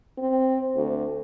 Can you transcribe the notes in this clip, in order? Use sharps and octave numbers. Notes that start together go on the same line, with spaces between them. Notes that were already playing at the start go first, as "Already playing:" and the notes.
C4
D2